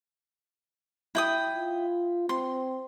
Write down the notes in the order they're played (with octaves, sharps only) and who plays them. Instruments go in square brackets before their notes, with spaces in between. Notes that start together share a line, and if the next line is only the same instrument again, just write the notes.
[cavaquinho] E4 G5 D#6
[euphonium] F4
[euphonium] C4 [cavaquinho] C6